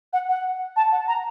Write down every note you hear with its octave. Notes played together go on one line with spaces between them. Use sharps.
F#5
F#5
A5
F#5
A#5